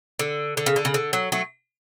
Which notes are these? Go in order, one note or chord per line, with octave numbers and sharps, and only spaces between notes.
D3
D3
C#3
D3
C#3
D3
F#3
F#3 A3